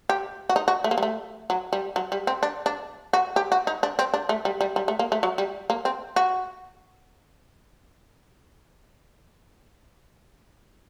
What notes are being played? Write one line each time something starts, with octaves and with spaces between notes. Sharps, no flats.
G4
F#4
D#4
F#4
A3
A#3
G3
A3
F#3
G3
F#3
G3
C4
D4
D4
F#4
G4
F#4
D#4
D4
C4
D4
A3
G3
G3
G3
A3
A#3
A3
F#3
G3
A#3
C4
F#4